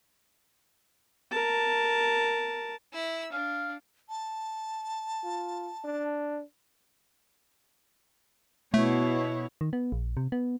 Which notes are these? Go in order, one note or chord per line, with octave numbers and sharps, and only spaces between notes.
A#4 A5
E4 E6
D4 F5
A5
F4
D4
B2 A3 E4 C#5
D#3
B3
A#1
C3
B3